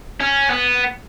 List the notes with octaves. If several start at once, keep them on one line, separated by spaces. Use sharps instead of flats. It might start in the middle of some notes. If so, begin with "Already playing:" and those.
C#4
B3